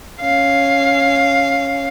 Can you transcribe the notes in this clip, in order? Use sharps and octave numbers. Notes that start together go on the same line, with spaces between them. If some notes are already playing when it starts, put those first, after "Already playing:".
C#4 F5